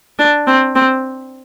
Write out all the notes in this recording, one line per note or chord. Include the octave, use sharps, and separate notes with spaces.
D4
C4
C4